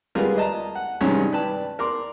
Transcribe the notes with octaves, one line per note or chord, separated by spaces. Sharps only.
G3 G#3 B3 F4 G#4 A#4
D#5 A5 A#5
F#5
G2 C3 D#3 E3 G#3 C#4
B4 D5 G5 A5
A#4 D5 C6 D6